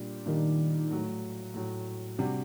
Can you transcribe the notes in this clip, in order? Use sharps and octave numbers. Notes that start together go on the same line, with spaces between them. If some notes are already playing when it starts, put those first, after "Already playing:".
Already playing: A#2 G3 D4 G4
A#2 D#3 G3 D4 G4
A2 F#3 A3
A2 F#3 A3
C3 G3 D4 F#4